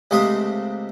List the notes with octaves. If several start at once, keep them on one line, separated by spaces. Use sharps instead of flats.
C#2 C3 A3 C6 D#6